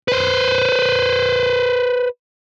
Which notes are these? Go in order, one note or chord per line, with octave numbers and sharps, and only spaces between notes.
B4 C5